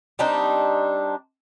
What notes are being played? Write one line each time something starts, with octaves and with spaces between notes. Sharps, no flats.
G3 C4 D4 D#4